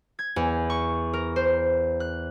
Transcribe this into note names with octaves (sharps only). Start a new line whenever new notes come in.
G#6
E2
C#6
A#4
C5
F#6